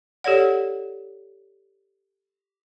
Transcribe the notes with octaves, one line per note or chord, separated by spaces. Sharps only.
G4 A4 C#5 D5 F#5